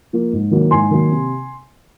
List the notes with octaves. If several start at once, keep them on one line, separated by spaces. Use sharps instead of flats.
F3 A#3
G#2
D#3 F#3 A#3
G#2 G#5 C6
D#3 F#3 A#3
C3